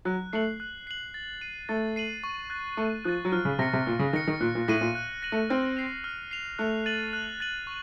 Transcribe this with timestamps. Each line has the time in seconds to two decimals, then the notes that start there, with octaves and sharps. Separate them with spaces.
0.05 F#3 F#6
0.33 A3 C7 F#7
0.60 F#6
0.87 C7 F#7
1.14 A6
1.41 C7 D#7 F#7
1.69 A3 A6
1.96 C7 D#7 F#7
2.24 C#6
2.50 F#6 A6
2.77 A3 C#6
3.05 F3 F#6
3.08 A6
3.25 F#3
3.32 F3 F6
3.45 C#3
3.59 C3 A#6 C#7
3.73 C3
3.86 A#2 F6
3.99 C#3
4.13 D#3 A#6 C#7
4.28 D#3
4.41 A#2 F#6
4.55 A#2
4.68 A2 A#6 D#7 F#7
4.81 A#2
4.95 F#6
5.22 A#6 D#7 F#7
5.32 A3
5.50 C4 F6
5.77 C7 F7
6.04 F6
6.31 C7 F7
6.58 A3 F#6
6.86 A6 D#7 F#7
7.13 F#6
7.40 A6 D#7 F#7
7.67 C#6